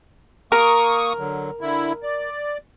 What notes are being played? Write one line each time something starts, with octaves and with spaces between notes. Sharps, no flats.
A#3 A#4 C#6 D#6
D3 F#3
D3 E4
D5